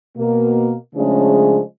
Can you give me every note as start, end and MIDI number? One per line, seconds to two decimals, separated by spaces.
0.17 0.73 47
0.17 0.73 58
0.95 1.60 49
0.95 1.60 53
0.95 1.60 56
0.95 1.60 57
0.95 1.60 61
0.95 1.60 62